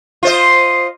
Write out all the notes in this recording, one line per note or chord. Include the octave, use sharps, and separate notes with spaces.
F4 C5 D#5